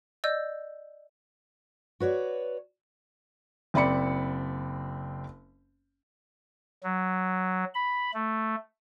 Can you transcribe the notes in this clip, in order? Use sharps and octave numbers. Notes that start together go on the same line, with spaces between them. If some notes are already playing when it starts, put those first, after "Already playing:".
D5 D#5 E6 G6
F#4 B4 C#5 D5
F#1 C4 D5 B5 C#7
F#3
B5
A3